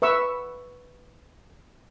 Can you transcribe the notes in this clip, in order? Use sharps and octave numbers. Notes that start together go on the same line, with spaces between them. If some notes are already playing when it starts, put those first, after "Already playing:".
B4 E5 C#6 E6